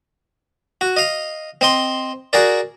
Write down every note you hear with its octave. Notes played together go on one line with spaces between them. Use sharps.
F#4
D#5 F5
C4 D#5 C6
F#4 G#4 A#4 D5